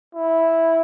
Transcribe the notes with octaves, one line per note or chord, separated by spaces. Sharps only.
E4